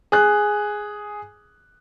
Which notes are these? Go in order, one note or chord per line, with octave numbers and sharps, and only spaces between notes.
G#4 F#6